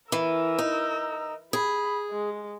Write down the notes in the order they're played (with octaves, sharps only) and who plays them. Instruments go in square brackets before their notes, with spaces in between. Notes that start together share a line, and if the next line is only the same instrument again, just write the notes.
[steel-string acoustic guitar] E3 [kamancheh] A#4 E6
[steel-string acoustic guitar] D#4
[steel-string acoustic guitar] G#4 [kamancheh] B5
[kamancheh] G#3